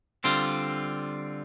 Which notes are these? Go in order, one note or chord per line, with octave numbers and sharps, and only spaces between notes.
D3 G3 C4 F4